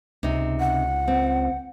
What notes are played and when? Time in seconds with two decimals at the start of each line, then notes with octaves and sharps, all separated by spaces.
0.23 C#2 C3 D#4
0.60 F#5
1.08 C4